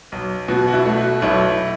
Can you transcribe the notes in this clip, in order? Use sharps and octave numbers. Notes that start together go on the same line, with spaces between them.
B1
B2 F#4
F#4
E4
A3
F#4
B1 E4